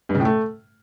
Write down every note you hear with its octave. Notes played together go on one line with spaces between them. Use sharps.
G2
C#3
A2
A3